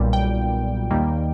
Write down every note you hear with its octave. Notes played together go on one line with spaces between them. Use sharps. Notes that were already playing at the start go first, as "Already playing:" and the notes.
Already playing: B1 A#2 G3
G5
D#2 D#3 G3 A#3